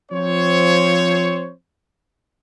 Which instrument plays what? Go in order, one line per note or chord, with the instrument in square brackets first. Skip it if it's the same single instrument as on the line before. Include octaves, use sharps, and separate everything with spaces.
[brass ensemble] F3 C4 C5 C#5